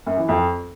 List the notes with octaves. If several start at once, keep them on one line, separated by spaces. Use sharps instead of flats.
F#2
E3
F2